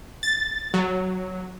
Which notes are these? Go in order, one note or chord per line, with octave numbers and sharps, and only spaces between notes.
A6
F#3